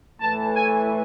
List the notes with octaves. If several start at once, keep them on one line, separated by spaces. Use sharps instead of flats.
A2 E3 A3 A5
G#5